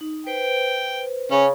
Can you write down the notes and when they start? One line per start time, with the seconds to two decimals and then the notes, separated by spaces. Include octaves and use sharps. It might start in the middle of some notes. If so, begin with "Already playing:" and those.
0.01 D#4
0.27 B4 C5 G5
1.31 C#3 C#4